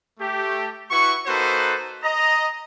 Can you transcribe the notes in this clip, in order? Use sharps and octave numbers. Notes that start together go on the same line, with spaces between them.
A3 G4
E4 F#4 B4 C#6
A#3 D#4 F#4 A4 B4 C5
D#5 A#5